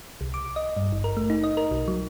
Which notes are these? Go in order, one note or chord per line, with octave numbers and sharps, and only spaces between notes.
C2
D6
D#5
G2
G#1
A#4
A3
D#4
D#5
A#4
B1
F#3